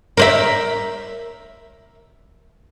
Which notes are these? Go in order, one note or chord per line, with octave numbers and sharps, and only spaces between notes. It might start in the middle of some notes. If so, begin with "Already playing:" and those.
A#4 C5 E5